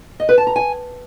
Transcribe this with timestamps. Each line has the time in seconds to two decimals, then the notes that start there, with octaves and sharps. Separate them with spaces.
0.20 D#5
0.29 B4
0.38 A5
0.47 A#5
0.56 G#5